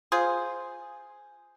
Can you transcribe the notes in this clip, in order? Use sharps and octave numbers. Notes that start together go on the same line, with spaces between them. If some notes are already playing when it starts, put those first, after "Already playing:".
F4 G#4 C5